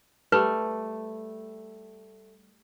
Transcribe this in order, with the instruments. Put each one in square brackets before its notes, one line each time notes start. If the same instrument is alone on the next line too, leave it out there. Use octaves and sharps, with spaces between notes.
[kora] G3 A3 [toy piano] B4